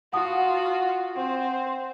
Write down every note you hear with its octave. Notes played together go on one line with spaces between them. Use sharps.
F4 F#4 F#5 A5 D#6
C4 C5 F#5